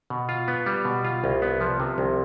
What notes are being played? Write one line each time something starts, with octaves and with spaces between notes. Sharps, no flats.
B2
F4
B3
G3
B2
F4
C2
B3
F3
C3
C2